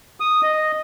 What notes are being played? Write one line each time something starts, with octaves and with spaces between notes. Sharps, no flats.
D#6
D#5